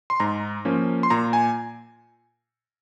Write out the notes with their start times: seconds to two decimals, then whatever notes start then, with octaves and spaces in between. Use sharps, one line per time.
0.10 C6
0.20 G#2 A#5
0.65 F3 A#3 C#4
1.03 C6
1.10 A#2 A#5
1.33 G#5